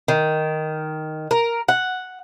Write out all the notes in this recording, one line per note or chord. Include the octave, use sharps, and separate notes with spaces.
D#3
A#4
F#5